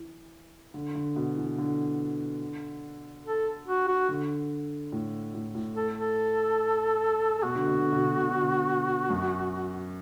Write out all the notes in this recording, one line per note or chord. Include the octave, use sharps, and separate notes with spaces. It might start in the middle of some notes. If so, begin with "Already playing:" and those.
Already playing: E3
D3
D3
B2
E3
D3
A4
F#4
F#4
D3
A2
A2
A2
A4
A4
A4
B2 F#4
D3
B2
D3
B2
D3
B2
D3
B2
F#2